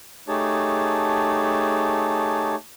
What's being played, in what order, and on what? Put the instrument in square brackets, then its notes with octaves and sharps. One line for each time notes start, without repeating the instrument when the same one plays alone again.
[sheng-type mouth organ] A3 D#4 G4 G#4 C#5 A5